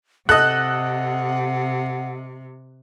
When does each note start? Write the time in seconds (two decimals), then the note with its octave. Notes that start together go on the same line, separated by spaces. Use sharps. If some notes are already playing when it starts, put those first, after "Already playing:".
0.29 C3 A4 D#5 F#5 F#6